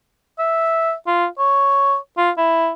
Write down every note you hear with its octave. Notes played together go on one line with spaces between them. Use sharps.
E5
F4
C#5
F4
E4